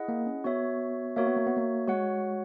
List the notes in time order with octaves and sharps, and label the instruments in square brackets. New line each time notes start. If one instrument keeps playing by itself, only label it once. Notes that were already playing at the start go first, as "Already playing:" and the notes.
Already playing: [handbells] E4 G#4 D#5 F#5
[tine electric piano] A#3
C#4
[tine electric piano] B3 [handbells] F#4 C#5 E5
[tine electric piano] A#3 [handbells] F#4 C#5 E5
[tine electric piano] B3
A#3
B3
A#3
[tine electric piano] G#3 [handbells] F#4 C#5 F#5